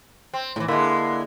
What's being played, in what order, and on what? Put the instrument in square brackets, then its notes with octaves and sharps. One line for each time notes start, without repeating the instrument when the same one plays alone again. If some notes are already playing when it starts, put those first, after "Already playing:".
[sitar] C4
[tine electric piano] A2 [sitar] C#3 E3
[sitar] D3 G#3 [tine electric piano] A#3 E4 E5